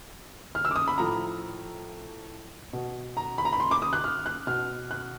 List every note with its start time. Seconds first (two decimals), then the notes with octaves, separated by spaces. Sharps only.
0.55 F6
0.65 E6
0.71 D6
0.76 D#6
0.88 B5
0.98 A2 F3 A#5
2.73 B2
3.17 A#5
3.38 B5
3.45 A#5
3.53 B5
3.60 C6
3.71 D6
3.82 D#6
3.93 F#6
4.04 F6
4.26 F#6
4.47 B2 F6
4.91 F#6